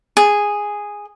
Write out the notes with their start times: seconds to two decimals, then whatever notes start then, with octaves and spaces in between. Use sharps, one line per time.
0.17 G#4